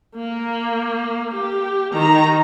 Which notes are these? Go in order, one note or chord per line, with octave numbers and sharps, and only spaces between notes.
A#3
G4
D#3 A#5